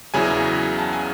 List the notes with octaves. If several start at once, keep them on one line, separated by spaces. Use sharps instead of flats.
E2 C#3 F#3 C#4 E4 G#5
A5
G#5